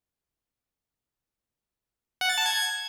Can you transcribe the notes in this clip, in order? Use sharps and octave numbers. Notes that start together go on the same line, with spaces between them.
F#5
A6
A5
G#6